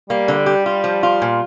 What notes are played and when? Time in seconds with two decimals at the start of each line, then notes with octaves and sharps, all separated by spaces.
0.10 G3 A#3
0.28 D3
0.46 G4
0.66 F4
0.84 F3
1.03 F4
1.22 A#2